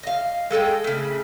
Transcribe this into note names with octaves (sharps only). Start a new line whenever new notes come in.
D#5 F5
G#3 A4 D#5 G5
A2 C#3